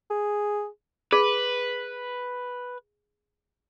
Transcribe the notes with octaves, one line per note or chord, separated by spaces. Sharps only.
G#4
G#4 B4